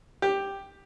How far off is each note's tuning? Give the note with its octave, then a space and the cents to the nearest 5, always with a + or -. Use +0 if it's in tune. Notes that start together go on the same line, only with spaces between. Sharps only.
G4 +5